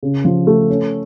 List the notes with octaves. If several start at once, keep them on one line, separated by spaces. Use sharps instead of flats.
C#3
F3
A3
C#4